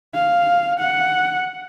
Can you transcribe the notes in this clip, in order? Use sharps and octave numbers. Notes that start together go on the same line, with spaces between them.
F5
F#5